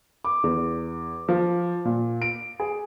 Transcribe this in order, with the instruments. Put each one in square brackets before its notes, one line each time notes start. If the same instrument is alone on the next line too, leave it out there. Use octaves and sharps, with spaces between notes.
[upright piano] D6
E2
F3
A#2
D7
G#4